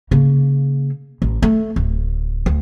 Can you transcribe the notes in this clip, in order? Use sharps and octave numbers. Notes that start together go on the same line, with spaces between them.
C#3 A#3
A1
A3
D1
D2